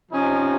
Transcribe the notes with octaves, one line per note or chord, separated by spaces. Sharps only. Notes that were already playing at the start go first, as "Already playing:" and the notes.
C3 F3 C#4 D#4